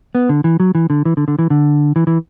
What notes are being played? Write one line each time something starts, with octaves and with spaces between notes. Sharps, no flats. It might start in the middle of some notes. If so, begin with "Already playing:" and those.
B3
D3
E3
F#3
E3
D3
E3
D3
D3
E3
D3
E3
E3